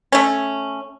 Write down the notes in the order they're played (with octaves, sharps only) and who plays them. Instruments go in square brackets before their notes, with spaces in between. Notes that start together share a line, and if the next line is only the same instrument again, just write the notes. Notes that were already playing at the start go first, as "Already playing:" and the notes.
[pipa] A3 C#4